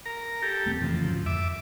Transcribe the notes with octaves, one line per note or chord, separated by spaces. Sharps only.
A#4 A#5
G4 A4
E1 A3 C4
F2 C#3 E3 C#4
D2 G#2 F#3
F2 E5 D6